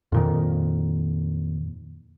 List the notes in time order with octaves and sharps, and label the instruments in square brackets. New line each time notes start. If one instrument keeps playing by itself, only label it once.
[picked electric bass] F2 A#2 D#3